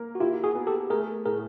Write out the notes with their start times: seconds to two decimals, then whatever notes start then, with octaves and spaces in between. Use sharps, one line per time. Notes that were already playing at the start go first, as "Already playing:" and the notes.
Already playing: A#3 A#4
0.15 F#4
0.20 E4 F4 G4
0.44 F#4 G#4
0.55 B3
0.67 G4 A4
0.90 A3 G#4 A#4
1.26 A2 G#4 A#4